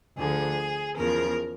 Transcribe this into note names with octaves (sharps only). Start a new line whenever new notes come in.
D2 D3 F3 G#4
E2 C#3 F3 A#4